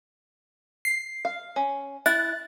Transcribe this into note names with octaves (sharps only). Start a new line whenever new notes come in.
C7
F5
C#4
E4 F#6 A6